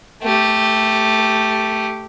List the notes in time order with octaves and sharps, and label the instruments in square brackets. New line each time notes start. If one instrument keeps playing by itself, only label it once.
[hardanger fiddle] A3 G4